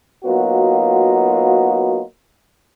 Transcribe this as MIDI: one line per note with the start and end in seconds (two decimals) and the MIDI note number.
0.25 2.01 54
0.25 2.01 58
0.25 2.01 59
0.25 2.01 63
0.25 2.01 65
0.25 2.01 66